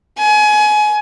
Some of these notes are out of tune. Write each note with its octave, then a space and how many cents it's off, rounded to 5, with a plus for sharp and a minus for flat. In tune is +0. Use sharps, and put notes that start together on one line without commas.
G#5 +25